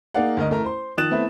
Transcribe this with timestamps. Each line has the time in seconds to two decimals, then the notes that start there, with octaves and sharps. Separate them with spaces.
0.14 A#3 D#4 G#4 D5 F5 F#5
0.37 D2 A#4 D#5
0.50 A1 A3 A#4 A#5
0.64 C5 C6
0.97 D#3 F3 D#6 F#6 A6 E7
1.11 A3 B3 C4 E4